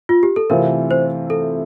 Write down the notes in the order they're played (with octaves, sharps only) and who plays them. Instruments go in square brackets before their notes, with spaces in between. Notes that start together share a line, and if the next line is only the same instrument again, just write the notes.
[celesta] F4
G4
A4
[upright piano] C3 E3 A3 C4 F4 [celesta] A#4
[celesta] C5
A4